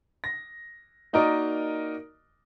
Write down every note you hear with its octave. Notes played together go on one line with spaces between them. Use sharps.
A#6
A#3 D#4 F#4 A#4 D5 D#5